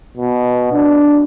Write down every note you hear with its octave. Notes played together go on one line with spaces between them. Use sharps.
B2
D4